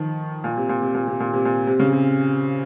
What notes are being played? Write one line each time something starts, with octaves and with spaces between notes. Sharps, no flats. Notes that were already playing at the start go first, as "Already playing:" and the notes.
Already playing: D#3 F3
A#2
C3
A#2
C3
A#2
C3
A#2
C3
A#2
C3
C#3
C3